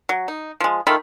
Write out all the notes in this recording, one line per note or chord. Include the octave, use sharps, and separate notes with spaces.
F#3
D#4
F3 G#3
D#3 A3 F4 B5